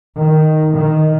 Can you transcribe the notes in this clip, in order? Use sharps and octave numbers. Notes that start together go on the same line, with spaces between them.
D#3
D#3